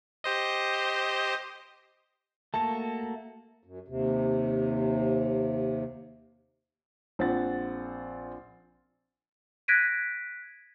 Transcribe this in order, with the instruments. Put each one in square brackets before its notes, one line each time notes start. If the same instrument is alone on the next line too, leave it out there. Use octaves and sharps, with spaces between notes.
[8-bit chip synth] G4 C5 D#5
[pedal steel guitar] A3 A#3 F#4 [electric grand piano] A5
[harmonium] F#2
D#2 C3
[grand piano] A#1 C4 F4 F#5 A6
[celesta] F#6 G#6 A#6 B6 D7 D#7